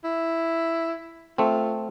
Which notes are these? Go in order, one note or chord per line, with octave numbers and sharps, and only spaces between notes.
E4
A3 C4 F4